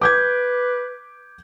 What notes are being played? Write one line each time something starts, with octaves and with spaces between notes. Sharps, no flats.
B4 D6 G6 G#6